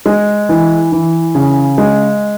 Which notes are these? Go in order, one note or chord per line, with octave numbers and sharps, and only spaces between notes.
G#3
E3
E3
C#3
G#3